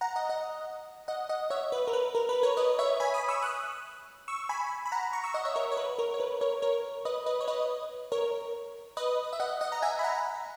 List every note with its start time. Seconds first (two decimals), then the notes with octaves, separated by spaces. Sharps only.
0.01 F#5 A#5
0.16 D#5 F#5
0.29 D#5 F#5
1.08 D#5 F#5
1.29 D#5 F#5
1.50 C#5 E5
1.72 B4
1.87 A#4
1.93 B4
2.15 A#4
2.29 B4
2.43 A#4 C#5
2.57 B4 D#5
2.79 C#5 E5
3.00 G#5 B5
3.14 B5 D#6
3.28 C#6 E6
3.42 D#6 F#6
4.28 C#6 E6
4.49 G#5 B5
4.86 B5
4.92 F#5 A#5
5.13 A#5 C#6
5.24 C#6 E6
5.34 D#5 F#5
5.45 C#5 E5
5.56 A#4 C#5
5.72 C#5
5.77 B4
5.99 A#4
6.14 C#5
6.20 B4
6.41 A#4 C#5
6.62 A#4 C#5
7.05 B4 D#5
7.26 B4 D#5
7.41 C#5
7.48 B4 D#5
8.12 A#4 C#5
8.97 B4 D#5
9.33 E5
9.40 D#5 F#5
9.61 D#5 F#5
9.72 A#5
9.82 E5 G#5
9.99 B5
10.04 F#5 A#5